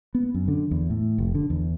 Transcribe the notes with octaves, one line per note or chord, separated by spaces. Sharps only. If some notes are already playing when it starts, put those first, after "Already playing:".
B3
F#2
D3
E2
A2
F1
D3
E2